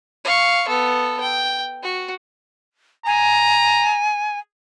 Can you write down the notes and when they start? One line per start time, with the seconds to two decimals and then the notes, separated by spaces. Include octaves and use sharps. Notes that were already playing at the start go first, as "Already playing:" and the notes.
0.24 F5 C#6
0.68 B3 A4
1.20 G5
1.83 F#4
3.06 G#5 A#5